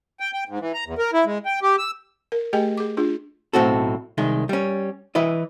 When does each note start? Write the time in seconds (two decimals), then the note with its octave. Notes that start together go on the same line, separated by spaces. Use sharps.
0.20 G5
0.33 G5
0.49 G#2
0.60 E3
0.74 A#5
0.86 E2
0.98 A#4
1.13 E4
1.25 G#3
1.46 G5
1.62 G4
1.79 E6
2.32 A#4
2.53 A3 G4 G#4 D#5 G5 G#5
2.78 G#4 D6
2.97 D4 F4 G#4
3.53 B1 A2 C4 F#4 A4
4.18 C2 D#3 G#3
4.49 G3 C#4
5.15 E3 E4 B4 D#5